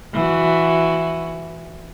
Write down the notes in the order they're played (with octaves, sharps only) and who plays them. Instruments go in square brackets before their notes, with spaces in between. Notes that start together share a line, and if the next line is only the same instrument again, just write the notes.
[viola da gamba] E3 F#4